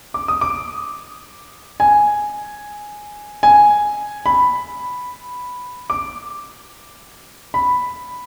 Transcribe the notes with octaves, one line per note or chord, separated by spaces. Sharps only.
D6
D#6
D6
G#5
G#5
B5
D6
B5